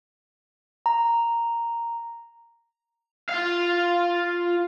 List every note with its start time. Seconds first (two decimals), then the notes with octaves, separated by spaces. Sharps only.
0.86 A#5
3.29 F4 F5